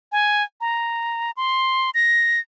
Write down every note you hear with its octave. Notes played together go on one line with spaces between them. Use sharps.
G#5
A#5
C6
A#6